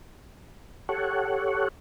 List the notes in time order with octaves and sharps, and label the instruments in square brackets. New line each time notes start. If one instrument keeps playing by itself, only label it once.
[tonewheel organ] G4 A4 C#5 F#5